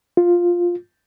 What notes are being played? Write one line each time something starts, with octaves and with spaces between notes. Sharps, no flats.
F4